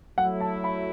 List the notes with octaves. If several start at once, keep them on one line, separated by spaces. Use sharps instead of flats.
F#3 A3 E4 F#5
A5
B5